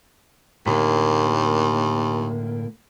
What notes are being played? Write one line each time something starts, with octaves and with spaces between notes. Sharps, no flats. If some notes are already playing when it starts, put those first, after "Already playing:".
D#2 A2 D3 A#3